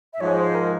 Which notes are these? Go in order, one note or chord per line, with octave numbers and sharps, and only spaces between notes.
E5
G#2 F3 G#3 C#5
C5
A#4